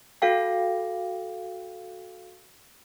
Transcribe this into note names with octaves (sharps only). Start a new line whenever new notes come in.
F#4 A4 F5 G5